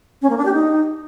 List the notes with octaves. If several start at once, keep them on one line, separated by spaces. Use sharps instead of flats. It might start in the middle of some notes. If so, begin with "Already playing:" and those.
C#4
A#3
D4
G4
D#4